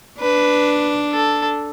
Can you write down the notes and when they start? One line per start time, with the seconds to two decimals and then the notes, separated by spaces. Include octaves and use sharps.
0.20 D4 B4
1.12 A4